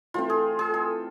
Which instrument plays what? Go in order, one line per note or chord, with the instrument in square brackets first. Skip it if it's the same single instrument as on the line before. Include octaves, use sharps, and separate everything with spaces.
[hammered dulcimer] E3 A3 C4 F4
G#4
G#4
A4